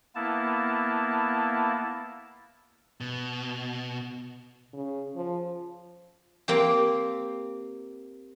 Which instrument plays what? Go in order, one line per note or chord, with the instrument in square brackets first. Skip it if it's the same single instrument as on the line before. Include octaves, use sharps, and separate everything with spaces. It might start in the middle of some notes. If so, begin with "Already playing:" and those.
[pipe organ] A#3 B3 E4 A5
[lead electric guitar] B2
[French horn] C#3
F3
[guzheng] A#3 C4 G4